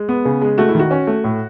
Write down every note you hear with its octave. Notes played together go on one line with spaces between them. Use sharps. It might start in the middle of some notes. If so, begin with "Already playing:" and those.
Already playing: G#3
B3
C#3
G#3
A3 F#4
E4
D#3 F#4
C#4
A3
A2